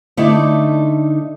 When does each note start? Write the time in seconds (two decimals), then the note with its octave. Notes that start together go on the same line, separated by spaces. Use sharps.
0.17 D3 A3 D#4 E4 D5